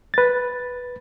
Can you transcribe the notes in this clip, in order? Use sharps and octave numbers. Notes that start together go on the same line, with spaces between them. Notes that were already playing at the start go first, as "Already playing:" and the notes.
B4 A6